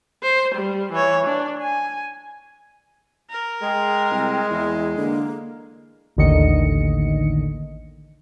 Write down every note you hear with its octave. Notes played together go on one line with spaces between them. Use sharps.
C5
G3
E3 C#5
D4
G#5
A#4
G#3 G5
C2
E2 E4
D3 A#3
A1 D#2 D3 D#3 D#5 C#7